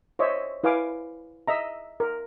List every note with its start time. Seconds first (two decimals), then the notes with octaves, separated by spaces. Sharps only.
0.19 C5 C#5 D#5 E5
0.64 E4 B4 F5 G#5 D6
1.47 D#5 E5 A#5
2.00 A#4